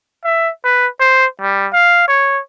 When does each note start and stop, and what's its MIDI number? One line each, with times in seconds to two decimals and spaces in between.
0.24 0.49 76
0.64 0.87 71
1.00 1.25 72
1.41 1.67 55
1.73 2.06 77
2.08 2.40 73